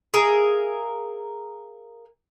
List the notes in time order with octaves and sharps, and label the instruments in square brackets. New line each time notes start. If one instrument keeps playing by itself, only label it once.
[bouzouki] G#4 A#4 E5 F5